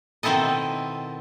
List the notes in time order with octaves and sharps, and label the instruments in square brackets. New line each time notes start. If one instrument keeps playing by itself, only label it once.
[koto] B2 D#3 C4 E4 A4 D#5